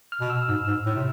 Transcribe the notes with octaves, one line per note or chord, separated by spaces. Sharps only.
F6
B2
E6
G#2 E6
G#2
A2
C3